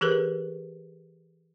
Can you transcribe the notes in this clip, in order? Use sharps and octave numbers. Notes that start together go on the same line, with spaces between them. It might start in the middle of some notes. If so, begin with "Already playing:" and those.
E3 G4 G#4 A#4 B4